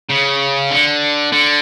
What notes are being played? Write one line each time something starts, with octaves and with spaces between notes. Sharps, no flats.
C#3
D3
D3